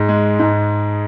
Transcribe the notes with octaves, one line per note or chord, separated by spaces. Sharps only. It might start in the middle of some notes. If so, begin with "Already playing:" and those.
Already playing: G#2
G#3
G#2